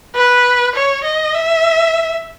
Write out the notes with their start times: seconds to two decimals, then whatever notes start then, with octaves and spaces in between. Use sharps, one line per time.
0.15 B4
0.75 C#5
1.04 D#5
1.34 E5